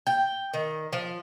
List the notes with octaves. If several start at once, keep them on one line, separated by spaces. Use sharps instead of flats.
G5
D#3
F3